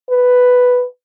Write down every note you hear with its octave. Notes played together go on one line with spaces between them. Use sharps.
B4